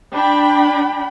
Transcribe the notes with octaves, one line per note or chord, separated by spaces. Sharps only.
D4 G5 B5